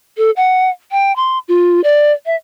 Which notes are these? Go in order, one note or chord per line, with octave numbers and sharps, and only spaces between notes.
A4
F#5
G5
C6
F4
D5
E5